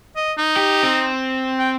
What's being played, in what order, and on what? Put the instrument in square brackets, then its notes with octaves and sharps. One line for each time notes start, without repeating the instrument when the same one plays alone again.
[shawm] D#5
D#4
[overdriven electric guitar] G4
C4
[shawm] G5